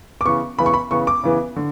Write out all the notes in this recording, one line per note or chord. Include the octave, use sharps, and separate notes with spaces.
D6
C#3 E3 B3 C#6
C#3 E3 B3 B5
C#6
B5
C#3 E3 B3 C#6
D6
C#3 E3 B3
D3